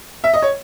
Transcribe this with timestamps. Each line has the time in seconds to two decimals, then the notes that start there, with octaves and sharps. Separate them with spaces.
0.24 E5
0.33 D#5
0.42 C#5